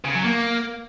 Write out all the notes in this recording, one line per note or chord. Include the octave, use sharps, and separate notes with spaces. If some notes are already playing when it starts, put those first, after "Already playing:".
C#3
F#3
A#3